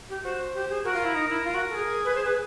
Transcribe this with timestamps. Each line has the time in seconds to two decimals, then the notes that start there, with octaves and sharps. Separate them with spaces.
0.09 G4
0.24 F#4 C5
0.54 G4
0.70 G#4
0.84 F#4 A#4
0.94 F4
1.04 E4
1.15 D#4
1.30 E4
1.45 F4
1.54 F#4
1.70 A4
1.74 G#4
2.05 B4
2.14 C5
2.25 B4